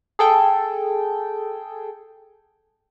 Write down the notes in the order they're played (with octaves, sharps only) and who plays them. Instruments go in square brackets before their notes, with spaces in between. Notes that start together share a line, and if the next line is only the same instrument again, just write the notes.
[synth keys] G#4 A4 G5